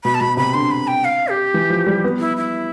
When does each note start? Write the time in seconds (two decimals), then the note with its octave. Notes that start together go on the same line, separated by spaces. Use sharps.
0.04 B2 B5
0.15 A5
0.20 B2 B5
0.37 C3 B5
0.54 D3 C6
0.71 B5
0.87 G5
1.05 F5
1.28 G4
1.54 E3
1.70 F3
1.86 G3
2.04 B3
2.20 E4
2.37 E4